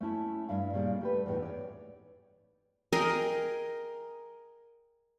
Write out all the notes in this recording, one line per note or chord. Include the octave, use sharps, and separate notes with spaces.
A3 C#4 E4 A5
G2 E4 F5
A#2 C#3 G3 D#4 D5
A3 G4 B4
E2 A2 D#4
C#5 D5
G#4 A#4 D#5 G5